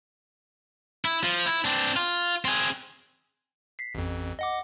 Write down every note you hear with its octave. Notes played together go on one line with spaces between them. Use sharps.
E4
F3
E4
C4 D4
F4
C4 G#4
B6 C7
A1 F2
D#5 F#5 D6